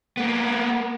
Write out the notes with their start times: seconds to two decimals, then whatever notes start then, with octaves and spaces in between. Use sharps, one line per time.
0.17 A#3 B3